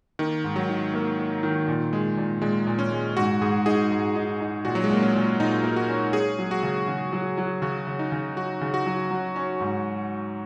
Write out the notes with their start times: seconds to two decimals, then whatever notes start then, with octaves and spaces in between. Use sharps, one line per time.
0.19 D#3 A#3
0.44 G#2
0.56 F#3
0.69 D#3
0.94 A#3
1.18 A#3
1.43 D#3
1.68 A#2
1.93 G#3
2.17 A#2
2.42 A#2 G#3
2.67 A#2
2.79 C#4
2.92 G#3
3.17 G#2 F#4
3.41 G#2 G#4
3.66 D#4 G#4
3.91 G#2
4.15 D#4
4.40 D#4
4.65 A#2 F#4
4.75 F#3
4.84 G#3
4.90 A#2 A#3
5.02 C#4
5.15 A#2
5.40 A#2 D#4
5.64 A#3
5.76 F#4
5.88 C#4
6.13 C#4 G#4
6.39 F#3
6.51 F#4
6.63 C#3
6.88 C#3
7.12 F#3
7.38 F#3
7.62 C#3 F#4
7.87 C#3
7.99 D#4
8.12 C#3
8.36 F#3 F#4
8.61 C#3
8.74 F#4
8.86 F#3
9.11 F#3
9.36 C#4
9.60 G#2